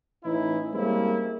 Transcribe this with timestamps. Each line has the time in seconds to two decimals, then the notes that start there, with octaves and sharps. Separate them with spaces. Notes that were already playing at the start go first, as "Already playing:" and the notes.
0.24 A2 E3 C#4 D#4 E4
0.73 G3 G#3 A#3 C4 C#4 E4